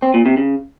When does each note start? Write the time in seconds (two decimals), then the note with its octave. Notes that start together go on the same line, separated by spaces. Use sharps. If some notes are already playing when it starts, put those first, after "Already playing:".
0.02 C4
0.14 A#2
0.26 C3
0.37 C#3